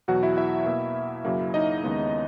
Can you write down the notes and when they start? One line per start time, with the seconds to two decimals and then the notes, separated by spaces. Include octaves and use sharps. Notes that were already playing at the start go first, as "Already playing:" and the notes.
0.08 E2 B2 F#3 F#4 F#5
0.23 E4 E5
0.37 E4 E5
0.66 B2 A#3
1.25 F#2 C#3 F#3 A#3
1.54 D#4 D#5
1.84 D#2 C#3 G#3 B3